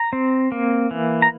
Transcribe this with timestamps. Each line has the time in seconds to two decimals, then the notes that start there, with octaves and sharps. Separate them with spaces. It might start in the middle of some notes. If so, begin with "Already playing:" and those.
Already playing: A#5
0.13 C4
0.52 A#3
0.91 E3
1.22 A#5